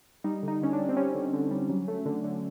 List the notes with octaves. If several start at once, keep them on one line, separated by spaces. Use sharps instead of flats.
G3 D#4
D3 D#4
D3 C#4
D4
G3
C4
G3 C#4
D3
D3
G3
F#3
A3
D3
D3